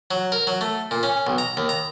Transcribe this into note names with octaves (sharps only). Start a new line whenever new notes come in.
F#3
A#4
F#3
A3
A#2
C#4
B1
A#5
D#2
A#5